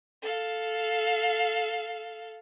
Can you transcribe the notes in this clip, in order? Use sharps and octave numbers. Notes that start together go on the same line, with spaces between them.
A4 F5